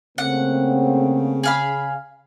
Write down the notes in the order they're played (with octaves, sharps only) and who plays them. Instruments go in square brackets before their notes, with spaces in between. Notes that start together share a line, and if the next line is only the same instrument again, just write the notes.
[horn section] C#3 [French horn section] A3 A#3 C4 [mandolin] F#5
[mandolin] G#4 F5 B5